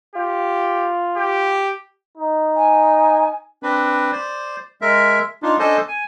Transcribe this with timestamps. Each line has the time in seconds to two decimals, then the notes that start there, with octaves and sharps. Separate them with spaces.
0.16 F4 G4
1.17 G4
2.17 D#4
2.56 G#5
3.63 C4 D4 B4
4.12 C5 D5
4.81 G#3 A#4 E5
5.43 D4 D#4 F4
5.59 C#4 D4 A4 C5 D#5
5.88 G#5